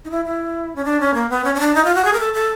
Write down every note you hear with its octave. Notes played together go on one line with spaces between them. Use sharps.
D#4
E4
E4
C#4
D4
C#4
A#3
B3
C#4
C#4
D4
D#4
F4
F#4
G#4
A#4
A4
A4